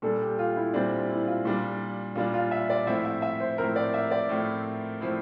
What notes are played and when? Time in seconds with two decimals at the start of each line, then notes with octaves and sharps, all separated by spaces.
0.02 A#2 G3 D4 A4
0.21 G4
0.39 F4
0.56 E4
0.74 A#2 G3 C4 D4
1.09 E4
1.27 F4
1.45 A#2 G3 D4
2.15 A#2 G3 D4 F4
2.34 F4
2.51 E5
2.70 D5
2.86 A2 F3 C4 E4 E5
3.05 E5
3.22 E5
3.40 C5
3.58 A2 F3 C4 E4 A#4
3.76 D5
3.94 E5
4.11 D5
4.29 A2 F3 C4 E4
5.01 A2 F3 C4 E4